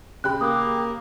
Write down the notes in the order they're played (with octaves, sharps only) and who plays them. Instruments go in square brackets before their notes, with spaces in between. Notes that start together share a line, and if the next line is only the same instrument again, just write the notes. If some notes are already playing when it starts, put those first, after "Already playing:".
[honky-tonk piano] C#3 G4 B5 [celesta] F#6
[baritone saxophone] A#3 [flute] D6 [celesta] D#6